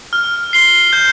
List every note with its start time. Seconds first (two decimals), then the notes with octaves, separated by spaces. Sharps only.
0.13 F6
0.53 C7 G7
0.93 G6